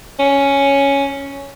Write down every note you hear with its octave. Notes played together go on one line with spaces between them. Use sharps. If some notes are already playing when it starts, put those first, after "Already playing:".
C#4